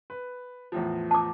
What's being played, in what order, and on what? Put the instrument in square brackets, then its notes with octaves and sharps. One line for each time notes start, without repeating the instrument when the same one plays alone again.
[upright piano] B4
E2 A2 F3
[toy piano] A5 D6